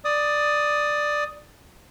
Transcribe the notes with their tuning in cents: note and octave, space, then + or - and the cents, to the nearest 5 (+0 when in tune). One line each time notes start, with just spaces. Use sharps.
D5 +10 D#6 +0